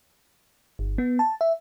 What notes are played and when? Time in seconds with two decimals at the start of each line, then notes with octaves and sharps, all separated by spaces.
0.79 G1
0.98 B3
1.19 A5
1.41 E5